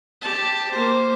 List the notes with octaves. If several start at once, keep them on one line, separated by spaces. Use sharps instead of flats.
G4 A5
A#3 C5